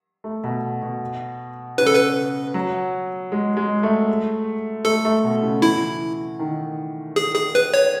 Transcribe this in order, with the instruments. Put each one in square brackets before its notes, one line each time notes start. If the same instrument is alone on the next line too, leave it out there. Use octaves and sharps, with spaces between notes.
[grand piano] A3
B2
B2
[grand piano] C#3 [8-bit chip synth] B4
[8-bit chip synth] A4
B4
[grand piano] F#3
G#3
G#3
A3
[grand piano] A3 [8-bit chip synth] A4
[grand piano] A3
B2
C#3
[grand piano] E3 [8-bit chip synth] E4
[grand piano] D#3
[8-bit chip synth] G#4
G#4
B4
C#5